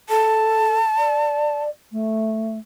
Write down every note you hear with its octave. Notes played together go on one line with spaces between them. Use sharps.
A4 A5
D5
A3